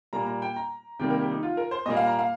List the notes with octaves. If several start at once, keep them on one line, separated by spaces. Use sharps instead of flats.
A#2 G3 A#3 A#5
A#5
G5
A#5
C3 D#3 G3 A#3 G5
A#4
G4
D#4
F4
A#4
C5
A#2 G3 A#3 D#5
F5
A#5
F5